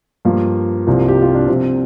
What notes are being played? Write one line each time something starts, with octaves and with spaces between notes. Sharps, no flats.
G2 F3 A#3
C2 C3 F3
G4
F4
D4
C2 C3 F3 C4